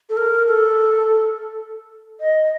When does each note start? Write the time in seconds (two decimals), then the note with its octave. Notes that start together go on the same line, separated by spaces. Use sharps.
0.09 A4
0.17 A#4
0.46 A4
2.20 D#5